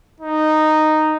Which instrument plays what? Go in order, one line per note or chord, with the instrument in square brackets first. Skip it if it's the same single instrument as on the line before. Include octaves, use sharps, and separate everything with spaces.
[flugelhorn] D#4